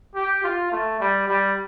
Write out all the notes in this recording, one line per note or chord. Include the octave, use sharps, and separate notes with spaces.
G4
F4
A3
G3
G3